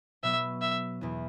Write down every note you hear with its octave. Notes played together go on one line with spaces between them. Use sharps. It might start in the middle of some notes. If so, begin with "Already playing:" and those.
B2 F#3 B3 E5
E5
E2 B2 B3 E4